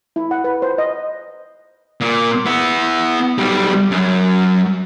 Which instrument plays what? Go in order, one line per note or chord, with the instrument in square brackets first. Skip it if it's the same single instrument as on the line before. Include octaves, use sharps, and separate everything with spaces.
[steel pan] E4
F#5
B4
C5
D#5
[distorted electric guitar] A#2
B3 E4
B1 G3
F#2